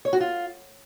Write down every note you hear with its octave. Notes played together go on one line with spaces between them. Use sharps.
C#5
F#4
F4